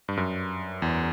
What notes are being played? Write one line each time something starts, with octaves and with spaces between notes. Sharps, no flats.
G2
F#2
E2